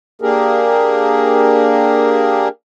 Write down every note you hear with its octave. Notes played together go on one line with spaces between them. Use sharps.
A#3 D4 G4 G#4 A#4